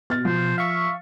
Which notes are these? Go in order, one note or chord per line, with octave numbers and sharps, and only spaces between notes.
B2 F6 A6
F3 C5
E5 F5 C#6